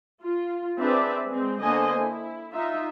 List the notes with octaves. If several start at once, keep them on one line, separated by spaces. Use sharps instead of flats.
F4
C4 D4 G#4 B4 D5 E5
G#3 C4
D3 A#3 B3 C5 D#5 G#5
E4
D#4 F4 E5